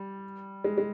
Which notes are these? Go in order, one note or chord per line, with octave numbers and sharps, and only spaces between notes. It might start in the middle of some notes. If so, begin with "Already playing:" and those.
Already playing: G3
G#3
G#3